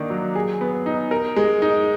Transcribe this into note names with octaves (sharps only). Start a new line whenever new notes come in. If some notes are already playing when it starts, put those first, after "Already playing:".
Already playing: D#3 A#3 D4
F#3
G#4
B3
D#4
A#4
G#3
D#4